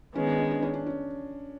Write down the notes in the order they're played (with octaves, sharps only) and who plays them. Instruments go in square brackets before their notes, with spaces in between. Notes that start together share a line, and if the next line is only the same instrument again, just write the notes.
[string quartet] D#3 G#3 B3 [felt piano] C#4
[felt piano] D4
C#4
D4
C#4
D4
C#4